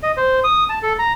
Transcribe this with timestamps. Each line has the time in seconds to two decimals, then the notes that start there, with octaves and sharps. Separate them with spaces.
0.03 D#5
0.17 C5
0.44 D#6
0.70 A5
0.83 A4
0.99 A#5